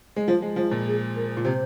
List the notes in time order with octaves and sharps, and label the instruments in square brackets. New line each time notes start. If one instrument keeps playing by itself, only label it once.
[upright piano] G#3
[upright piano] F3 [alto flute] F4
[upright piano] G#3
[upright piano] F3 [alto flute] F4
[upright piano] A#2
[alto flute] G#4
A#4
[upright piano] A#2
[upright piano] C3 [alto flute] C5